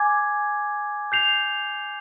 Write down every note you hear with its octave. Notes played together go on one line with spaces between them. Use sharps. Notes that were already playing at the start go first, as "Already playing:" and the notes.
Already playing: G#5 D6 G#6
G6 C7 F7